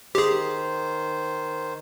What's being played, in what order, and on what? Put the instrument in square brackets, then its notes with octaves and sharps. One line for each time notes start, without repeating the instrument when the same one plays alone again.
[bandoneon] D#3 C5 [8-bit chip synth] G4 G#4